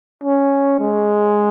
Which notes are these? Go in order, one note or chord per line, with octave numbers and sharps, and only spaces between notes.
C#4
G#3